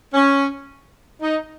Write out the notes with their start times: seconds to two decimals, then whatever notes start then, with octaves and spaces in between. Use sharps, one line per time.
0.14 C#4
1.21 D#4